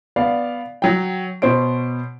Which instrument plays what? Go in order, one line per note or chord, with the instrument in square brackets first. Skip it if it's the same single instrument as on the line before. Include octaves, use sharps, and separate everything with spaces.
[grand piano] B3 D5 F5
F#3 G5
B2 C5 C#5 D7